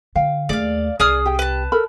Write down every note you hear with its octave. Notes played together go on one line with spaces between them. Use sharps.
D3 F5 G5
D#2 A3 G#4 D5 F5
C2 G#4 D5 D#6 F6
G4 G5
B4 A5
A4 A#4 B5